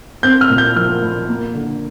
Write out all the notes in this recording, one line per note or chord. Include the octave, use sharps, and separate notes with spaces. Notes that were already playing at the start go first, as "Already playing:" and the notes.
C4 G6
F6
A#2
G6
F3 F6
A#2
A#3
D3